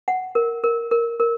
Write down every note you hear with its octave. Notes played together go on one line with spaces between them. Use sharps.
F#5
A#4
A#4
A#4
A#4